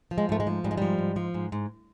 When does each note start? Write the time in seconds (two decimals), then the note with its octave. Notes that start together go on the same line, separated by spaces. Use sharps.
0.11 F3
0.18 G#3
0.29 G#2 A3
0.40 G#3
0.47 F3
0.64 G#2 G3
0.71 G#3
0.77 F3 G3
0.98 G#2
1.16 F3
1.34 G#2
1.52 G#2